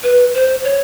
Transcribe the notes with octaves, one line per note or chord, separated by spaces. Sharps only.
B4
C5
C#5